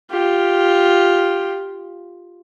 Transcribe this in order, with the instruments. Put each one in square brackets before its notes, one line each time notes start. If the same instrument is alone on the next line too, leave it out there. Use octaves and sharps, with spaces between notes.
[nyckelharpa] F4 G4